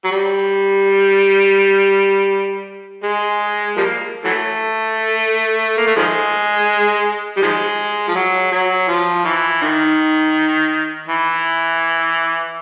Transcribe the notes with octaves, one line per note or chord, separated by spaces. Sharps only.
F#3
G3
G#3
F3 G3 A#3
E3 F#3 A3
A#3
A3
D#3 F3 G#3
G3
D#3 F3 G#3
F3
F#3
F#3
F3
E3
D#3
E3